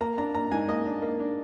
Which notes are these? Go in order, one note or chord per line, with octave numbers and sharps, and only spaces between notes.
A#3 A#5
D4 A#5
A#3 A#5
G#2 G#5
A#3 D#5
D4
A#3
D4